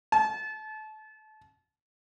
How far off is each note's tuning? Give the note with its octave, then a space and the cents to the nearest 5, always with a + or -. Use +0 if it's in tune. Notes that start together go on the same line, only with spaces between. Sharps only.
A5 -30